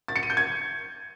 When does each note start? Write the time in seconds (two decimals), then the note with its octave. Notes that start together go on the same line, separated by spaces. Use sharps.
0.08 A6
0.16 C#7
0.23 D#7
0.30 G6
0.37 G#6